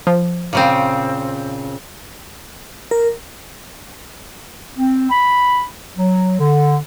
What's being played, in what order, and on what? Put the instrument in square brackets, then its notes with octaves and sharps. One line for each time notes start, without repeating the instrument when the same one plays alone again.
[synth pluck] F3
[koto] A#2 C#3 C4
[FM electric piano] A#4
[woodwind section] C4
B5
F#3
D3